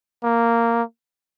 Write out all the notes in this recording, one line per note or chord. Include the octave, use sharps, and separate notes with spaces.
A#3